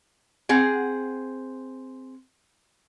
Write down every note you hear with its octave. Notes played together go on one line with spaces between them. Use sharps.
C4 G#4 F#5